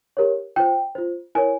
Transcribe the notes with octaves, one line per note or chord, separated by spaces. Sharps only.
G4 A#4 C#5
F4 C5 G5
F4 C5
E4 A#4 C#5 G#5